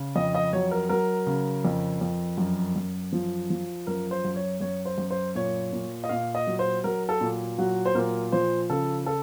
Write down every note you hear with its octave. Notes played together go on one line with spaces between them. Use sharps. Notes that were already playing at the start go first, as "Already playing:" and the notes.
Already playing: C#3
F2 D#5
D#5
F#3 C#5
A#4
F#3 A#4
C#3
F2
F2
F#2
F#2
F3
F3
F#2 A#4
C5
F#2
C#5
F#2 C#5
C5
F#2
C5
A#2 C#5
A#2
D#5
A#2 F5
D#5
F#3
C5
F#3 A#4
A4
A#2
F#3 F#4
C5
A#2 A#4
F3 C5
C#3 A4
A4